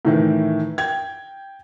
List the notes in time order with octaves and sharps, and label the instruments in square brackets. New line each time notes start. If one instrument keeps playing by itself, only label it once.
[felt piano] A2 D#3 E3
G5 G#6